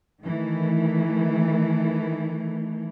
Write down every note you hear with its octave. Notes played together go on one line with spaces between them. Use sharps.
D#3 E3 A3